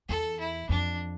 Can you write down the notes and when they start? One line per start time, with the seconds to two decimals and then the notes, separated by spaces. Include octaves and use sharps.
0.09 E2 A4
0.39 E4
0.69 F2 D4